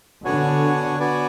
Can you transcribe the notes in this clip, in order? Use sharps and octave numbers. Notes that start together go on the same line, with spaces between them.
D3 B3 D4 F#4 C#5 G#5
B3 F#4 B4 D5 G#5